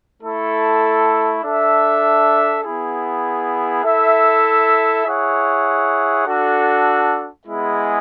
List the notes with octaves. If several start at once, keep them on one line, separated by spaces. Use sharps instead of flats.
A3 E4 A4
D4 A4 E5
B3 E4 G#4
E4 A4 E5
E4 G#4 C#5 F#5
D4 F#4 A4
G#3 B3 E4 G#4